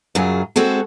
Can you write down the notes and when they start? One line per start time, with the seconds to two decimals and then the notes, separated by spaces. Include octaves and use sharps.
0.15 F#2 C#3 F#3 F4 G#4
0.56 G#3 C4 F#4 G#4 A4